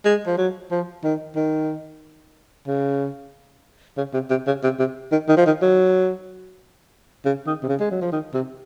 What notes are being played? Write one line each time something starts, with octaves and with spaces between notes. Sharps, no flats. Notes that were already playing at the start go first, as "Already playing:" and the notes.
G#3
F3
F#3
F3
D#3
D#3
C#3
C#3
C3
C3
C#3
C3
C3
D#3
D#3
F3
D#3
F#3
C#3
D#3
C3
C#3
G#3
F#3
F3
D#3
C3